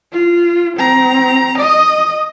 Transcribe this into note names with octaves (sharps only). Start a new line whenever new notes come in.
F4
C4 A#5
D#5